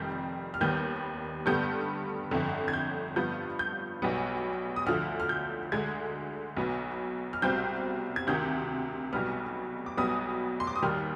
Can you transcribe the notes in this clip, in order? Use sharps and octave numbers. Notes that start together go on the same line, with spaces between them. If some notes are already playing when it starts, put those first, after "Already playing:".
Already playing: F1 F2 D#3 G3 G6
F6
D#2 D#3 G3 B3 G6
G2 D3 G3 B3 G6
G1 F2 D3
G#6
G6
G2 F3 B3 G6
G6
B1 B2 G3 B3
D#6
D2 D3 F3 F6
F6
G6
D2 D3 G#3 G#6
B1 B2 B3
F6
C2 B2 G3 C4 G6
G#6
D2 C3 D#3 G6
B1 B2 G3 B3 F6
D6
B1 B2 G3 B3 D#6
C6
D6
D#6
D#2 D#3 G3 F6